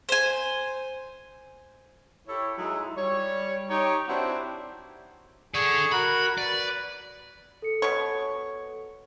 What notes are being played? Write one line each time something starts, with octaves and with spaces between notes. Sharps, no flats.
C5 G#5
E4 G4 A4 C#5
F#3 G#3 D#4 E4
G3 C#5
D#4 G4 C#5
C4 D4 E4 F#4 G4 C5
G#4 A4 D5 C#6
F#4 A#4 B5
B4 D5
A4 C#7
B2 C#5